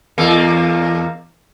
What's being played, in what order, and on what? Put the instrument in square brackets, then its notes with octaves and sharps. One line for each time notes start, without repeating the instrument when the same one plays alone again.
[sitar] E2 A#3